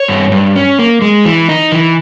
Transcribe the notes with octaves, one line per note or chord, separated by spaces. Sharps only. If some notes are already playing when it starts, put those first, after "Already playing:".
Already playing: C#5
G2
G2
C#4
A#3
G#3
E3
D#4
E3